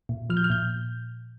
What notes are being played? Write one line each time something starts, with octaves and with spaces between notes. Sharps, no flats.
A#2
F3 F6
G6
F6
A#2 G6